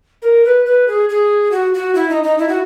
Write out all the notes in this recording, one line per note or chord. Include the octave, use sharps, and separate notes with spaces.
A#4
B4
B4
G#4
G#4
F#4
F#4
E4
D#4
D#4
E4
F#4